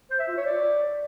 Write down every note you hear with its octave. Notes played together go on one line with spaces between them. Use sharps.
C5
E5
F4
C#5
D5